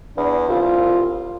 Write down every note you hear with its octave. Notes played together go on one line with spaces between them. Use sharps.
E2 D4
C2 F4